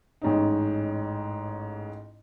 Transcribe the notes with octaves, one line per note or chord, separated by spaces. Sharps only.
A1 G#2 C#4 D#4